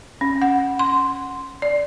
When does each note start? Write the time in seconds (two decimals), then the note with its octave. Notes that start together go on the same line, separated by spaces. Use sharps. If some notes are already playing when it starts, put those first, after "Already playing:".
0.21 C#4
0.42 F#5
0.79 C6
1.62 D5